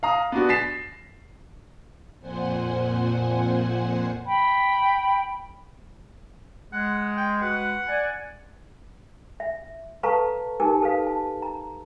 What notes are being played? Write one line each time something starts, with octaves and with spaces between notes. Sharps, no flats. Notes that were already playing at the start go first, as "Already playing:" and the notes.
F5 A#5 D#6
B3 D4 F#4
A6 B6 C7 E7
F2 A#2 C5 F#5 G#5 C6
G5 B5
G#3 F#5
G5
G#3 F#4 B4 F#5
D5 G#5
E5
A4 B4 F5 A5 A#5 C#6
D#4 G4 A#4 G#5 A5 D6
A4 B4 F5
A5
A#5